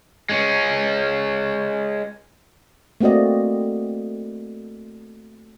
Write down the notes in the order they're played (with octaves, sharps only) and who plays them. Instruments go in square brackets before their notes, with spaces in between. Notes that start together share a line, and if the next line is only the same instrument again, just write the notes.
[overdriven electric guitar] G#3 C#4
[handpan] A3 A#3 C4 F#4 D5 D#5